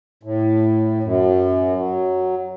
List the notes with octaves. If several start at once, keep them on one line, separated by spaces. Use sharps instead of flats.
A2
F#2
F#3